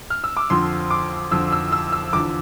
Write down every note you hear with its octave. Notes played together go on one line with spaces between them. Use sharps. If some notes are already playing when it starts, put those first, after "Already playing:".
F6
E6
D6
F2 D3 F3 C6
D6
F2 D3 F3 E6
E6
E6
E6
E2 D3 F3 D6